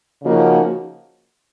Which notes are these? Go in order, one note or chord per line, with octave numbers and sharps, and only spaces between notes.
C#3 F3 A#3 D#4 F#4